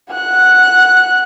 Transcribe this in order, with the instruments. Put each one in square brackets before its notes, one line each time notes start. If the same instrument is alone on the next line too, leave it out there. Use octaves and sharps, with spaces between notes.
[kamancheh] F#5 F#6